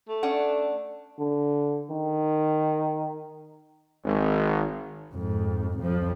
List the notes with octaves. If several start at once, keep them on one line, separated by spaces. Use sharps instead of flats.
A3
C#4 D4 F#5
D3
D#3
G#1
F2 G#2
F2 F3